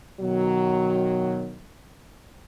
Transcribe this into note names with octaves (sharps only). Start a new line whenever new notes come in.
B2 D#3 F#3